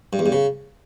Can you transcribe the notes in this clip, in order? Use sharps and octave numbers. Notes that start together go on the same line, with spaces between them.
G2
E2
G2
C#3